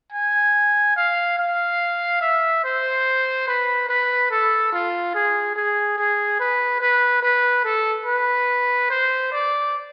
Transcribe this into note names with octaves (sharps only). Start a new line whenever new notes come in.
G#5
F5
F5
E5
C5
B4
B4
A4
F4
G#4
G#4
G#4
B4
B4
B4
A4
B4
C5
D5